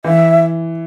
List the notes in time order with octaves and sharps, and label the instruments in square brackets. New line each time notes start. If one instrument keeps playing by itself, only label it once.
[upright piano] E3 [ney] E5